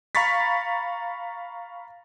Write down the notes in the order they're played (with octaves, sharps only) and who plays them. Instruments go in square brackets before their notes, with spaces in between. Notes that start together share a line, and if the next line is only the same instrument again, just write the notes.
[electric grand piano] F5 A#5 B5 C#6 A6 B6